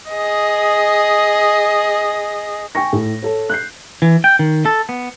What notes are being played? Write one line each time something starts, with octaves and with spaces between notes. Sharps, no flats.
G#4 D#5
G5 G#5 C#6 A#6
A2
A4 C#5
F#6 G6 C7
E3
G5
D#3
A4
B3